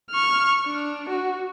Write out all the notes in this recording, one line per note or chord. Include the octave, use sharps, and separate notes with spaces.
C#6 F6
D4
F#4